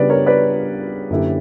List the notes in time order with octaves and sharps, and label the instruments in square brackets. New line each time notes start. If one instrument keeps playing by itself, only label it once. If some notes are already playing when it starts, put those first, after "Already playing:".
Already playing: [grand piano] C#3 G3 B3 D4 [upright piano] B4 D5
[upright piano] A#4 C#5
B4 D5
[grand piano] F#2 D3 A#3 E4 G4